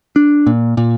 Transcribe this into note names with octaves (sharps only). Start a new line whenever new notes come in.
D4
A#2
A#2